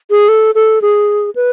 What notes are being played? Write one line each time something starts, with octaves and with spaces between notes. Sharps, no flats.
G#4
A4
A4
G#4
B4